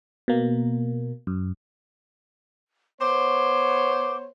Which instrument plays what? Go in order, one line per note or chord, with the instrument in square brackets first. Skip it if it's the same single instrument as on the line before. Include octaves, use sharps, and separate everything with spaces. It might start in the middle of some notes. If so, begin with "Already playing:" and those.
[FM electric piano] B2 A#3
F#2
[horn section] B3 C5 C#5 [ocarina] D6